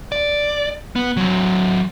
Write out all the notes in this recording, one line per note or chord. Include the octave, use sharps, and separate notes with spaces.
D5
B3
F#3 C4